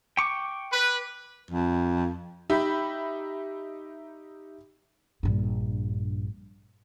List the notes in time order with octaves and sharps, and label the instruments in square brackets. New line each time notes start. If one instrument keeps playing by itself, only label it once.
[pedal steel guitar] G5 C#6 D6
[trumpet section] B4
[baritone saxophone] F2
[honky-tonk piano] D#4 G4 E5 B5
[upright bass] A#1 G2